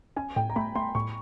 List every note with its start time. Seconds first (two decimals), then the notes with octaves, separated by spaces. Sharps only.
0.16 C#4 G#5
0.36 A2 G5
0.50 A#5
0.56 A3 B5
0.75 A3 C6
0.95 A2 C#6